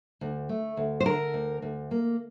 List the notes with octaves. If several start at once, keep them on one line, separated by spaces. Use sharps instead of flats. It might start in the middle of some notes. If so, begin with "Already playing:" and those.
D2
A3
D2
C5
D3 A#4
D2
D2
A#3